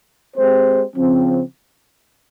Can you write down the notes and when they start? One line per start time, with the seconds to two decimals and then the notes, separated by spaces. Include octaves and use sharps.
0.37 G#3 C4 G4 C5
0.96 C#3 F3 C4